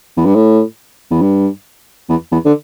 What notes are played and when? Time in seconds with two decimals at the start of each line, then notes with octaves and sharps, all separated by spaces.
0.17 E2
0.25 G2
0.35 A2
1.11 E2
1.21 G2
2.09 E2
2.31 E2
2.45 D3